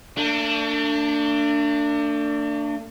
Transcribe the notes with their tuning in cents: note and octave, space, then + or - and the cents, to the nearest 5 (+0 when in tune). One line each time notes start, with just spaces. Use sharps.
A3 +45 D4 +0